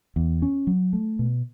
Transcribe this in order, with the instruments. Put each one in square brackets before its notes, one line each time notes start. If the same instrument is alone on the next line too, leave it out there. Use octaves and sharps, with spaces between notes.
[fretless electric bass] E2
C#4
F#3
A3
B2